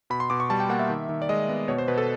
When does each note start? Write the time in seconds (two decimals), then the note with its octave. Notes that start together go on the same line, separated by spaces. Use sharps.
0.10 B2 B5
0.20 C6
0.30 B2 D6
0.40 C#6
0.50 G3 A5
0.60 G5
0.69 A#3 F#5
0.79 E5
0.90 D#3
1.09 D#3
1.22 D5
1.29 G#3 D#5
1.49 B3
1.68 B2 C#5
1.78 C5
1.88 B2 B4
1.98 A4